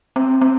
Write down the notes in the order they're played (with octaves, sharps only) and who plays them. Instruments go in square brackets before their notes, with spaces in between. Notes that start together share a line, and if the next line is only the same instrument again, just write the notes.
[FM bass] C4
C4